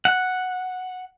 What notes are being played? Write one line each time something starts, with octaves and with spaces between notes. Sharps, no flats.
F#5